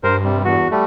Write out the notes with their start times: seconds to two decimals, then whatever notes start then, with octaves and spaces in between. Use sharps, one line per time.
0.04 G2 A#4 C5
0.24 C3 G3
0.45 E2 F#4
0.71 G3 A3